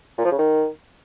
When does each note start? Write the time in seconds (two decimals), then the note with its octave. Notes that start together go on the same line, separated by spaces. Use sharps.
0.18 A#2
0.25 F3
0.31 C#3
0.38 D#3